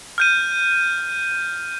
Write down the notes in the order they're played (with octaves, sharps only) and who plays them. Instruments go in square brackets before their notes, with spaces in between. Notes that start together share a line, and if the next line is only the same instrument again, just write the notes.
[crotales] F6 G6 D#7